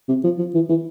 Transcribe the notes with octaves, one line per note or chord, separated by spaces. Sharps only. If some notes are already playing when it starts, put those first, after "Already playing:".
C3
F3
F3
E3
E3